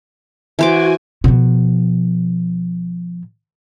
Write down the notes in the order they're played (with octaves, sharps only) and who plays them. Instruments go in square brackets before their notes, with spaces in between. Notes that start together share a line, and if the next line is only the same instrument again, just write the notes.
[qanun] E3 C5 D6 [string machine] F#4 G#5
[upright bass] B2 F3